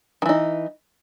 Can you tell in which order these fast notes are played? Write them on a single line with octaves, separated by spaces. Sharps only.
D#3 E3 D#4